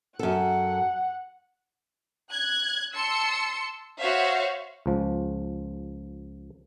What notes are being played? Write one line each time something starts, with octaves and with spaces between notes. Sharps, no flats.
F#2 A4 F#5
F#6 G#6
A5 C6 E6 C#7
F#4 C5 C#5 E5 F5
C#2 F3